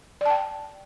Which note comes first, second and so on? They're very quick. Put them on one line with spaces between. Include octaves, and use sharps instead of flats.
D5 A5 G5